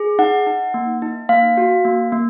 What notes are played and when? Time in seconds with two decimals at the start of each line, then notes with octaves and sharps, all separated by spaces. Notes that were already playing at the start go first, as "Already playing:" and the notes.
Already playing: G#4
0.19 D#4 F#5
0.47 D#4
0.74 A#3
1.02 D#4
1.29 A#3 F5
1.57 F#4
1.85 A#3
2.12 A#3